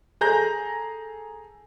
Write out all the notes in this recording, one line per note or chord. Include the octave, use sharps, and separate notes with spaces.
G#4 A4 A#5 G6 A#6